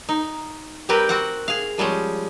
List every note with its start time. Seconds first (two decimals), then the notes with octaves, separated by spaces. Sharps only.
0.09 D#4
0.89 G3 C4 G4 A#4 B4
1.09 C4 F#4 F#5
1.48 G#4 F5
1.78 F3 G3 G#3 C#4